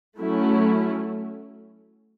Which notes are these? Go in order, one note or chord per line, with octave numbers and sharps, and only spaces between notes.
F#3 A3 C#4 E4